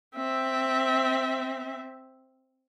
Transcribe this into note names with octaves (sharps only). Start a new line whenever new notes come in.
C4 E5